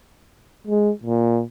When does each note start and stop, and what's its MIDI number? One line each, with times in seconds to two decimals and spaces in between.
0.67 0.91 56
1.04 1.42 46